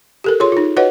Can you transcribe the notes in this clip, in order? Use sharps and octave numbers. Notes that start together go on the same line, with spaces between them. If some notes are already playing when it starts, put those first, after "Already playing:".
G4 A4 A#4
F4 G#4 C#5 C6
D#4 F4
F#4 B4 C#5 D#5 F#5